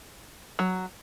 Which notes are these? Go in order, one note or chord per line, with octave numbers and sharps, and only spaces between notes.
F#3